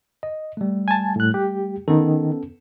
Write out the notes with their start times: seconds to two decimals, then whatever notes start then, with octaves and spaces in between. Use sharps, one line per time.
0.23 D#5
0.57 G3 A3
0.88 G#5 A5
1.16 A2 F#6
1.34 G4
1.88 D#3 B3 C#4 A4